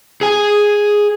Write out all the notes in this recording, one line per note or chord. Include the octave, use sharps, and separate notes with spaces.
G#4 G#5